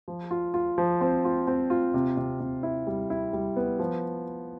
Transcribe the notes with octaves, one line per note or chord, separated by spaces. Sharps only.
F3
F4
F4
F3
C4
F4
C4
F4
C3
C3
C3
E4
G3
E4
G3
B3
F3